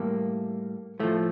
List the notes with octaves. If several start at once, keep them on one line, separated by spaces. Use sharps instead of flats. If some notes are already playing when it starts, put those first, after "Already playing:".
Already playing: A2 G3 A#3
A2 F3 A3